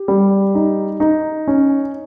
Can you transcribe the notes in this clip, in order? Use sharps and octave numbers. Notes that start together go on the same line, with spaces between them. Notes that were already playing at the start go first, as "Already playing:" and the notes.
Already playing: G4
G3
D#4
D#4
C#4